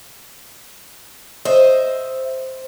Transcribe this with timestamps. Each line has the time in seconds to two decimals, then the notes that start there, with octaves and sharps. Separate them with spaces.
1.45 C5 D#5 E5